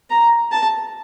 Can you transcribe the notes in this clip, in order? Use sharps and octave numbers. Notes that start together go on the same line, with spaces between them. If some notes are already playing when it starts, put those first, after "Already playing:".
A#5
A5